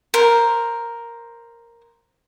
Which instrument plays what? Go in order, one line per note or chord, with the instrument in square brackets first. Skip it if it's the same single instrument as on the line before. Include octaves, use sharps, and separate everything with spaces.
[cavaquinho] A#4 C5